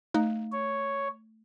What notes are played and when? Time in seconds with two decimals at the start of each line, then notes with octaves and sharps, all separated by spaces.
0.14 A3 D#4
0.52 C#5